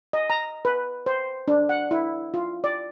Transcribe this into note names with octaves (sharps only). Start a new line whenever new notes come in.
D#5
A#5
B4
C5
D4
F#5
E4
F4
D5